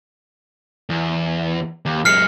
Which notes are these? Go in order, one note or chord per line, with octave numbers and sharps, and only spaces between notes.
E2
D#2
F#2 G#3 F6 C7 C#7